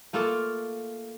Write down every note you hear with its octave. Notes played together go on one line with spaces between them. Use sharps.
A3 A#3 F4 A4